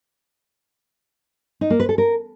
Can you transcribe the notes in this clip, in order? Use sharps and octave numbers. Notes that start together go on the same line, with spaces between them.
D#4
A#3
B4
A4
A#4